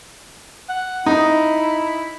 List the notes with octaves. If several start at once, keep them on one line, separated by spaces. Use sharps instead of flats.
F#5
D#4 E4